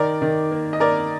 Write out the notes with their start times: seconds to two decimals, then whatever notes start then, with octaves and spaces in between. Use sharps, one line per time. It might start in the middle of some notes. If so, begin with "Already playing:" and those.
Already playing: D#3 A#4 D5
0.22 D#3
0.51 A#3
0.73 D#5
0.80 A#3 A#4 D5